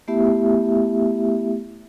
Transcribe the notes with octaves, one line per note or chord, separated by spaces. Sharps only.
A3 B3 E4 G4 E5